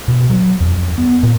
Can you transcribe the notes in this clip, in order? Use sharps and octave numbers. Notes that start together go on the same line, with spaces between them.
B2
F#3
F2
B3
A#2